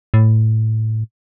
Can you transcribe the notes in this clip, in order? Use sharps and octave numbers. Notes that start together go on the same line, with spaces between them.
A2